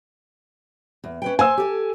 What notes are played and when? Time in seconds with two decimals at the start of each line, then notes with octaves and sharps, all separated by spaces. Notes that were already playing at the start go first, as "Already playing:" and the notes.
1.04 E2
1.22 C#4 B4 G5
1.39 C5 G#5 E6
1.57 G4 A4